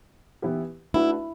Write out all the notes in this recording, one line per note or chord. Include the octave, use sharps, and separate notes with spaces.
E3 B3 E4 G4 B4
A3 D4 E4 F#4 B4